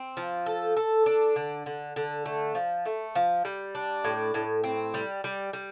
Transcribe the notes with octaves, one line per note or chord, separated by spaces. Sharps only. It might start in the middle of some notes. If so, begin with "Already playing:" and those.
Already playing: C4
F3
A4
A4
D4
D3
D3
D3
A3
F3
A3
F3
G3
D4
A2
A2
C4
G3
G3
G3